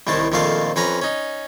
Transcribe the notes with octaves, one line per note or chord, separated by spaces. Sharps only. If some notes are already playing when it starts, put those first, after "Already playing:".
C2 A2 D#3 A3 A5
A#1 F2 D#3 A3 F5 A5
F2 C#4 B4 A#5
C#4 D#4